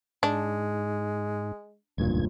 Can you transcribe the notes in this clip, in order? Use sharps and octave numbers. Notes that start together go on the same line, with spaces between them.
G#2 G#3 D4
E1 D2 G2 A#2 G#6